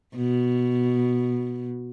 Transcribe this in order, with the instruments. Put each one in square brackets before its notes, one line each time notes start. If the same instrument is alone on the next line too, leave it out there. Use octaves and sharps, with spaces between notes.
[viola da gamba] B2